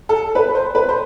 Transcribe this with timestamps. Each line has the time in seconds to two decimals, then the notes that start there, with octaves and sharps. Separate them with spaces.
0.09 A4
0.35 B4
0.55 C5
0.75 B4
0.89 C5